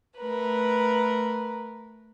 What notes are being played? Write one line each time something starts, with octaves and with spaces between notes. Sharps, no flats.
A3 A#4 B4